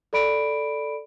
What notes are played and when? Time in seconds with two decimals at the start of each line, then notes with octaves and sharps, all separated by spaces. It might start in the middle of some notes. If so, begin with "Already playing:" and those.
0.13 A4 D5 B5 D7